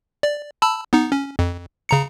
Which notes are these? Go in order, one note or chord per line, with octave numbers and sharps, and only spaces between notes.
D5
A5 B5 E6
B3 D#4
C#4
F2
C#3 A#5 C#7